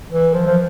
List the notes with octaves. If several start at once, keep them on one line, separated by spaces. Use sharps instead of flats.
E3
F3
F3